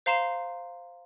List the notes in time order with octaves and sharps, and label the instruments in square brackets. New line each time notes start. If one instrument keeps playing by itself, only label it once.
[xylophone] C5 F5 A#5 C6 C7 E7